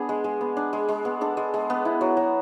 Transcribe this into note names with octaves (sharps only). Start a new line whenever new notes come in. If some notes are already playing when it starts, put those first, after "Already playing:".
Already playing: B3 D4 G#4
G#3
G#3
B3
D4
G#3
G#3
B3
D4 A4
G#3
G#3
B3
E4
F#3
F#3